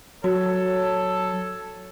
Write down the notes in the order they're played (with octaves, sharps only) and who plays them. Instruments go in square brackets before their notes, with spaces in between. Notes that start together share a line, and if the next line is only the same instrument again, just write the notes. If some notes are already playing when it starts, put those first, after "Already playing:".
[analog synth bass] F#3 [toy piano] F#4 [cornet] A4 [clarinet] C#5